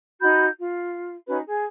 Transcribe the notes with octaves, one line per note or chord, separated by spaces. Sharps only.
D#4 F#4 B5 G6
F4
C#4 D#4 F#4 B4
G#4